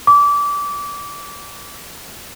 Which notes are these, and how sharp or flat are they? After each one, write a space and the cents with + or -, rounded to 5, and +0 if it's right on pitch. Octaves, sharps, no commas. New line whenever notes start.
D6 -25